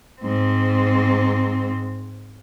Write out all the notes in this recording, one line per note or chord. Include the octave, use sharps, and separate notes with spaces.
G#2 C4